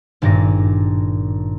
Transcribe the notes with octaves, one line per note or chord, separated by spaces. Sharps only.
G#1 G2 A#2 D6 A#6